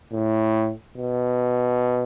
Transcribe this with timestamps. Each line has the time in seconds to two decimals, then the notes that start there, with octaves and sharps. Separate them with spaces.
0.12 A2
0.97 B2